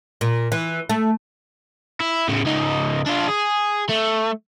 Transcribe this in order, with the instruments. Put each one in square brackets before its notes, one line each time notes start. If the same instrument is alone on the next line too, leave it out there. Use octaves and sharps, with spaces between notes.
[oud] A#2
E3
A3
[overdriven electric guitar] E4
A2 C#3
C#2 D#4
D4 F4
G#4
A3